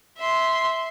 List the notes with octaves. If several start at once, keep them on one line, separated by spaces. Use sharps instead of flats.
E5 C6